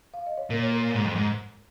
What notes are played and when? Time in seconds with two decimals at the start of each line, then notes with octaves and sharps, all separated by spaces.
0.14 F5
0.26 D#5
0.38 C#5
0.50 A#2 A#4
0.63 C#5
0.72 A#4
0.94 G#2
1.05 F2
1.15 G#2